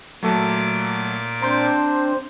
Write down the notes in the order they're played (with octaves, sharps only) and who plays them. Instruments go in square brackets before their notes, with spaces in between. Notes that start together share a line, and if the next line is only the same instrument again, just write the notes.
[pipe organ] A#2 D6 [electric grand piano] F#3 A3 A4
[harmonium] C4 D4 C5 [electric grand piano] A#5 C6 G6